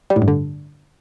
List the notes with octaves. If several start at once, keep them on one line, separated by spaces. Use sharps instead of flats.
G3
A2
G2
D3